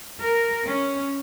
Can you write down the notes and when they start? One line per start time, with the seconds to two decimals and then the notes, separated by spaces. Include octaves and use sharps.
0.21 A#4
0.67 C#4